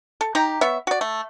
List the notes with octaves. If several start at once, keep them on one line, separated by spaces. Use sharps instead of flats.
A4
D#4 G4 A#5
B3 C#5 E5
F#4 D5
A3